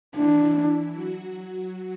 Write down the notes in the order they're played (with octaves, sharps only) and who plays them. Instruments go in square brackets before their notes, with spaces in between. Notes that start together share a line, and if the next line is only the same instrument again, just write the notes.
[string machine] E3 E4 [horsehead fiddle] D4
[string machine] F#3 F#4